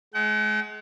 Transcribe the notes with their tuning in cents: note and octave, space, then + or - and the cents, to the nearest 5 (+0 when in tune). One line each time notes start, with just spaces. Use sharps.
G#3 +30 F#5 +45